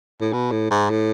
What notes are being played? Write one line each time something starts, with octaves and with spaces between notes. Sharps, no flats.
A2
B2
A2
G#2
A2